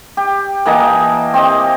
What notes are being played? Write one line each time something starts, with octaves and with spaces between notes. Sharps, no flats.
G4
E3 A#3 D#5 A5
C4 G4 D#5